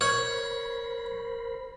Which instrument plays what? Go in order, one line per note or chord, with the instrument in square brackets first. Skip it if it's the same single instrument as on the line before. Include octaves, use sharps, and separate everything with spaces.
[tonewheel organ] A#4 C5 B5 [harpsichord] C#5